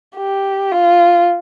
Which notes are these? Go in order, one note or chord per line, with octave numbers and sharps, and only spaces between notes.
G4
F4